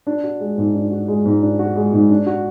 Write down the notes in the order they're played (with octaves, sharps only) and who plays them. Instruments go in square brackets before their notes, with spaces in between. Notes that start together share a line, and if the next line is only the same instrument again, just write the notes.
[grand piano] D4
F#4
G#3
G#2
D4
F#4
G#3
G#2
D4
F#4
G#3
G#2
D4
F#4